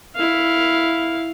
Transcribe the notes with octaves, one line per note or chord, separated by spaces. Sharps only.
E4 F5